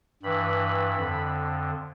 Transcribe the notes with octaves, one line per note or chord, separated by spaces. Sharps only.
G2 E3 B5
F2 D3